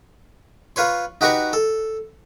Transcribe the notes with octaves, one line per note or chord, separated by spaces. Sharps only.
F4 B4 C#5 C6
D#4 F#4 G4 B4 A#5 C#6
A4